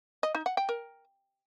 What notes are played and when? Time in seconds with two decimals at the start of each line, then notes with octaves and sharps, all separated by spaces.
0.23 D#5
0.35 D#4
0.46 F#5
0.57 G5
0.69 A#4